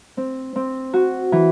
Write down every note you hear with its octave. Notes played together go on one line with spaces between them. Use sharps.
C4
C4
F#4
E3